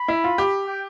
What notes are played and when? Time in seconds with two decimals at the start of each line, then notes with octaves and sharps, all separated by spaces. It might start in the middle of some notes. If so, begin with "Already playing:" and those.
Already playing: B5
0.08 E4
0.24 F4
0.38 G4
0.67 G5